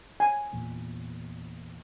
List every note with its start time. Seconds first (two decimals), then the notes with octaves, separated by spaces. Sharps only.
0.20 G#5
0.53 E2 A#2